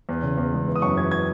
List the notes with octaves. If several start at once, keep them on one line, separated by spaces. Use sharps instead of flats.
E2
C#3
E2
G#3
E3
D#6
F#2 C#6
E3 G#6
G#6